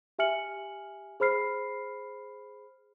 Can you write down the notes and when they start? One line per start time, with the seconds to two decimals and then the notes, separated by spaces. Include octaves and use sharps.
0.19 G4 E5 G#5 F6 C#7 F#7
1.20 G#4 C5 B5 F6 C7